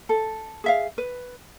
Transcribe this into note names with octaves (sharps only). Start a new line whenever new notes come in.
A4
G#4 E5 F5
B4